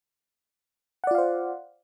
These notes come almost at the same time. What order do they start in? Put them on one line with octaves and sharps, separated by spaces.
F#5 D5 F4 F5 C5